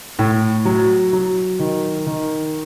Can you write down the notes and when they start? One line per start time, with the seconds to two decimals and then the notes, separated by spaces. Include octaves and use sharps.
0.19 A2
0.65 F#3
1.13 F#3
1.59 D#3
2.07 D#3